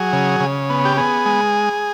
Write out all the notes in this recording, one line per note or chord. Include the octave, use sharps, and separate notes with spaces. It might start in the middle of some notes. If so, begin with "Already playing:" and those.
Already playing: F#3 G#4
C#3
C#3
B3
G4
B3 G#4
G#3